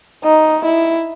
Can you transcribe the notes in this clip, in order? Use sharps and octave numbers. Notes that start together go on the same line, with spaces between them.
D#4
E4